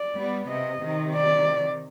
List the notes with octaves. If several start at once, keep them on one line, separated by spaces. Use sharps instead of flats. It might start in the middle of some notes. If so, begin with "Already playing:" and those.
Already playing: D5
G3 B3
C3 D#5
C3 D#3
D5